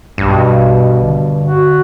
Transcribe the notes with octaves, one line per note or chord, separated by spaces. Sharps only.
A#1 G2 B2
D3
F#4